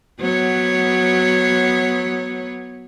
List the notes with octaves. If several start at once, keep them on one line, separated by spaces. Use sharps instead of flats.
F#3 B3 C#5